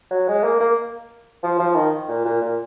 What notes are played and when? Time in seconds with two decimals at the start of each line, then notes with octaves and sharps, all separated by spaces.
0.11 F#3
0.28 G#3
0.44 A#3
0.60 A#3
1.43 F3
1.59 F3
1.75 D#3
2.08 A#2
2.25 A#2
2.41 A#2